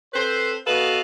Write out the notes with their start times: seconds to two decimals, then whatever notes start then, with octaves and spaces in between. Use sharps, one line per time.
0.13 C4 A4 B4 C5
0.67 B3 F#4 A4 B4 D#5 F5